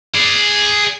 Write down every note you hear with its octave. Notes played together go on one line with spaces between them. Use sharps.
G#4 D5